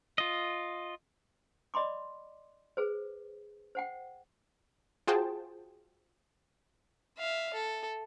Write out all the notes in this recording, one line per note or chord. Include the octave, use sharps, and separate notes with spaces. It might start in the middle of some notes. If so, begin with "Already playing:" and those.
F4 D#5
D5 D#5 B5 C6 D6
G#4 B4 C5
C5 F#5 G5
F4 F#4 G#4 C5 G5 A5
E5 F5
A4